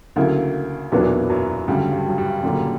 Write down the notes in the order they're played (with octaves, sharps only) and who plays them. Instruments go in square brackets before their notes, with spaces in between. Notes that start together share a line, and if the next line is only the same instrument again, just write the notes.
[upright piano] D2 C#3 F#3 A#3 E4
[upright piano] B1 A#2 F#3 B3 D4 [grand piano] E2 E3
[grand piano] F#2 F#3
[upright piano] D2 C#3 F#3 [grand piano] G2 G3
[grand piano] G2 G3
F#3
G2 G3
[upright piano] F#1 F#2 D3 G3 [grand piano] A#2 A#3